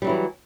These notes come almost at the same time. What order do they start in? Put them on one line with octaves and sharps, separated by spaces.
G3 F#3 E4 E3